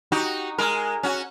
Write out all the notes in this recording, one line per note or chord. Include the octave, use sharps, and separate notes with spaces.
D#4 F#4 G4
G#3 A#4
C#4 F#4